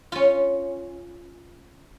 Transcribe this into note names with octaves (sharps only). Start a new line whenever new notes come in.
C#4 F4